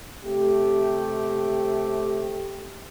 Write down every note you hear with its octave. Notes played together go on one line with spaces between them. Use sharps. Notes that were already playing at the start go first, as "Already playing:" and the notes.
C3 A3 G4